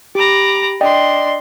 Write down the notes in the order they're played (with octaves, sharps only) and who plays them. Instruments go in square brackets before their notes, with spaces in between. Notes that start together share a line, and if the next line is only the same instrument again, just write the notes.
[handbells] G4 [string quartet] A#5 B5 D6
[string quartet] D4 C6 [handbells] D5 D#5 G5